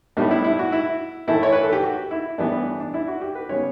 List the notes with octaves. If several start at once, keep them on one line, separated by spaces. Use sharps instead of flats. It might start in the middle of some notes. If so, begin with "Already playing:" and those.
A2 G3 B3 D4
E4
E4
F#4
E4
A2 E3 A3 E4
C#5
B4
A4
G4
F#4
E4
A2 E3 G3 B3 D4
D4
E4
F#4
G4
B4
C#3 G3 B3 C#5